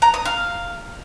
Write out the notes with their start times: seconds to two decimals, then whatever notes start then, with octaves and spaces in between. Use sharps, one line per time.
0.02 A#5
0.14 D#6
0.25 F5